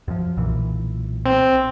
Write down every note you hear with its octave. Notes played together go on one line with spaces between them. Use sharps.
F#2 F3
B1 A#2 E3
C4